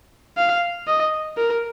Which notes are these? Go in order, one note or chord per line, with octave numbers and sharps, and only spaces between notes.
F5
D#5
A#4